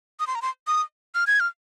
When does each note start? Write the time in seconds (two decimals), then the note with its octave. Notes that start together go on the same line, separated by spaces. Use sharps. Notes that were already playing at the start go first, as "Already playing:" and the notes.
0.20 D#6
0.27 C6
0.35 A#5
0.42 C6
0.67 D#6
1.15 F6
1.27 G#6
1.40 F6